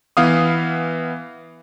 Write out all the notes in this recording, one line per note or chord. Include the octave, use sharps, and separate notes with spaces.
E3 B3 F5 D#6